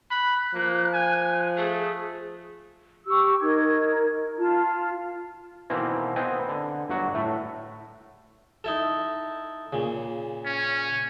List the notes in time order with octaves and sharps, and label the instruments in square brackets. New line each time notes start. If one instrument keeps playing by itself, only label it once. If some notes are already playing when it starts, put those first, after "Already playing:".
[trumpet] B5 [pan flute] F#6
[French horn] F3 [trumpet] A#3
[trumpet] G#5
[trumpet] A3 [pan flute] G#4
[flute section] G4 C#6 E6
D#4 A#4 G#6
F4 A5
[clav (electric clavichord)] B2 D#3 E3 A#3 C4 E4
B3 C4 D#5 G5 G#5
D3
G1 F#3 F#4
A2 A3 E5
[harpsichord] D#4 E4 A4
A#2 C#3
[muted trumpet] C#4